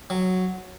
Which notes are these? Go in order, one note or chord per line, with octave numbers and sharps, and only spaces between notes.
F#3